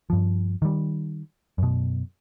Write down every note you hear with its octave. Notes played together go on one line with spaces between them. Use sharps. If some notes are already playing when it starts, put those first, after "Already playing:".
G2 F3
D#3 G3
F#2 B2